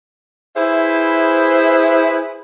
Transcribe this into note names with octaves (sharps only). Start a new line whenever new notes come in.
E4 G#4 B4 C5 E5